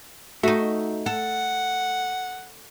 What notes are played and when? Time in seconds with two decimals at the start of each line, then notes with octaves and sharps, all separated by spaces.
0.43 A3 D#4 F#4
1.06 A4 F#5